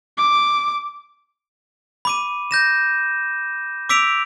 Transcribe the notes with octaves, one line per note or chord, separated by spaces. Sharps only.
D6
B5 D6 D#7
G6 A#6 E7
D6 E6 B6 D7 F7